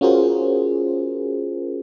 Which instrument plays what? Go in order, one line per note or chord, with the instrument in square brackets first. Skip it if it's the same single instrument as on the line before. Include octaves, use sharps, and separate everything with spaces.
[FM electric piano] C#4 F4 F#4 G#4 A#4 C5